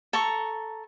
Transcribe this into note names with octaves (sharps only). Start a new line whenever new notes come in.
A4 A#5 C#6